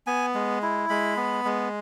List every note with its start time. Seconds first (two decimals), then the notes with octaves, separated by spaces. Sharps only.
0.07 B3 G#5
0.34 G#3
0.62 E4
0.89 G#3 B5
1.17 B3
1.45 G#3